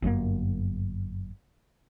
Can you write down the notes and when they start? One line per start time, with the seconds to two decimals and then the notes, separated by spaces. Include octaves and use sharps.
0.02 G1 F#2 B2 A#3